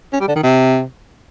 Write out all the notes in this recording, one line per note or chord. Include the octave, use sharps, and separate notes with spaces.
C#4
G3
D3
D#3
C3